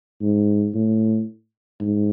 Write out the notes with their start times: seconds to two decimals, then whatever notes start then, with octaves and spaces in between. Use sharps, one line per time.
0.22 G#2
0.75 A2
1.81 G#2